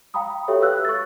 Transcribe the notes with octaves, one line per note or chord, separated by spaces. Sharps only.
F5 G5 A#5 B5 D#6
F#4 G4 A4 C#5 E5 G5
B4 F5 E6 F#6
C#6 A6